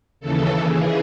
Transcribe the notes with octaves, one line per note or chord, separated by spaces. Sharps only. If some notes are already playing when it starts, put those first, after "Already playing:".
D#2 C#3 E3 A4
G#4